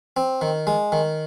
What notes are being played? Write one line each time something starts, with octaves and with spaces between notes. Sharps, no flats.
C4
D#3
G#3
D#3